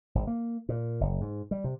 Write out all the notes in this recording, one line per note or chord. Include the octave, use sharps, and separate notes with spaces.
G#1
A#3
A#2
F#1
G#2
G3
C3